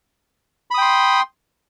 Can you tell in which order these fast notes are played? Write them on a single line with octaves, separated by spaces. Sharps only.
B5 D#6 G5 C6